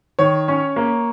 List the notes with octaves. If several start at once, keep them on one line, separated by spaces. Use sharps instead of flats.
D#3 C#5
C#4
A#3